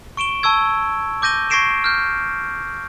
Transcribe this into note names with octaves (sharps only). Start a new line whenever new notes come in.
C#6 D7 E7 G7
A5 C#6 E6 G#6
D6 G6 A#6 D#7 G7
C#6 G#6 A#6 C7 D7 E7
F6 G6